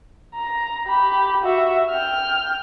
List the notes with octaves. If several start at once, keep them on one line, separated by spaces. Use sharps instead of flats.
A#5
G4 B5
F#4 E5
G5 F6